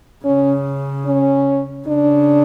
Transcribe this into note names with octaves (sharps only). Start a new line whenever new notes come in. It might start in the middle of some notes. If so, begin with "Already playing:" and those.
C#3 C#4
C#4
C#3 D4